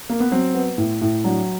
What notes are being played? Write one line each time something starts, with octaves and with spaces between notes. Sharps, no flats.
A#3
B3
F#3 C4
B3
A2
A2
F#3 D4